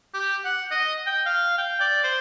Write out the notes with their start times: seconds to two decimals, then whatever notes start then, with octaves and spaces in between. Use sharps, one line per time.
0.14 G4
0.45 F#5
0.71 D#5
1.06 G5
1.26 F5
1.58 G5
1.80 D5
2.04 C5